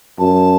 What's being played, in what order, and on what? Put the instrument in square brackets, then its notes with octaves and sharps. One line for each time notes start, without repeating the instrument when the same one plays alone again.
[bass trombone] F#2 [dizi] A5